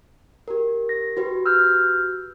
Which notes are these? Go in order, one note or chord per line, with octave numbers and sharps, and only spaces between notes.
G4 A#4
A#6
F#4 G4 B4
E6 F6 G6